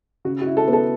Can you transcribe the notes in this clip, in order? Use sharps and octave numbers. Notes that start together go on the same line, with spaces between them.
C#3 F#4
F#4
E4
A4
B3
A4